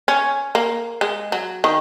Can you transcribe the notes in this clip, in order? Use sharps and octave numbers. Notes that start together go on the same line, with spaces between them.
C#4
A#3
G#3
F#3
D#3